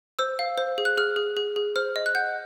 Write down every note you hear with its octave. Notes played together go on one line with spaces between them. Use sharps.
C5 E6
F5
C5
G#4
F#6
G#4 F6
G#4
G#4
G#4
C5 F6
D#5
F#6
F#5 G6